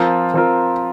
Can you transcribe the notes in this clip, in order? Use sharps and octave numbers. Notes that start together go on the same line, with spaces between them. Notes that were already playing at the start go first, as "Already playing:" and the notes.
Already playing: F3 C4 F4 A#4
F3 C4 F4 A#4